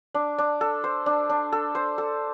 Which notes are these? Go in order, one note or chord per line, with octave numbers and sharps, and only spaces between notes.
D4
D4
A4
C5
D4
D4
A4
C5
A4